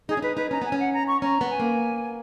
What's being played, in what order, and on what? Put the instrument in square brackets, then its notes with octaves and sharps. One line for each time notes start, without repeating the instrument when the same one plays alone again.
[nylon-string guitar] D#4 [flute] G#4
[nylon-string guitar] C#4
[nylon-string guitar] D#4 [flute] B4
[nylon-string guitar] D#4 [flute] B4
[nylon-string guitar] C#4 [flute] A#5
[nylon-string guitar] B3 [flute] G#5
[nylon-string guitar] C#4
[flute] F#5
A#5
C#6
[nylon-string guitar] C#4 [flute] A#5
[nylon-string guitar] B3
[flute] G#5
[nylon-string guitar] A#3